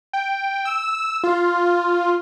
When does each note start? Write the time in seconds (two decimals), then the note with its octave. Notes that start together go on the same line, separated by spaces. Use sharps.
0.13 G5
0.65 E6
1.24 F4